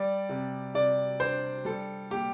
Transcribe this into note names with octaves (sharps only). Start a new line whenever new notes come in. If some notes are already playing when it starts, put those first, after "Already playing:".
Already playing: G3 D5
C3
C3 D5
D4 C5
G3 A4
A#2 G4